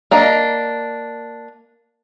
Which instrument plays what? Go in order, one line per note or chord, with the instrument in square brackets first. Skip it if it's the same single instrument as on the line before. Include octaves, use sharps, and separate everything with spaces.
[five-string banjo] A#3 D4 D#5